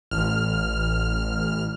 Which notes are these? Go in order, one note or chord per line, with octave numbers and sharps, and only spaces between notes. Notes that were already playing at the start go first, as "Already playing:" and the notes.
A1 F6